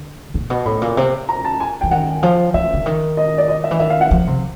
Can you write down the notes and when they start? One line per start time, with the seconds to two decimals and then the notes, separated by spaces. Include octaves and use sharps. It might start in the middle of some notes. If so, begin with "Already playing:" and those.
Already playing: D3
0.34 A#2
0.50 B2
0.66 A2 B5
0.82 A#2
0.97 C3
1.29 A#5
1.45 A5
1.60 G#5
1.81 E3 G5
1.91 D#3 F#5
2.23 F3
2.54 E3 E5
2.73 D3
2.86 D#3
3.17 D#5
3.38 D5
3.48 D#5
3.64 E5
3.71 E3
3.80 D#3 E5
3.90 F5
4.01 F#5
4.11 F3
4.27 C3